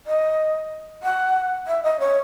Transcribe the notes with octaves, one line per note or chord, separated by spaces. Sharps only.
D#5
F#5
E5
D#5
C#5